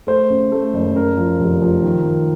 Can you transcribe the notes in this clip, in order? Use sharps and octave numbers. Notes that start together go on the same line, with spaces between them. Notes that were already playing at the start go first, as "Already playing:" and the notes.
A3 C5
C#3
A3
F#1
C#3 A#4
F3
F1
F3
D#3
D#3